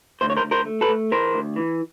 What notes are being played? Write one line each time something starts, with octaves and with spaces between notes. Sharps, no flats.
D2 C5
C#5
A#4 C5
D2
A#4 C5
A3
A4 B4
A3
E3 A#4 C5
D2
E3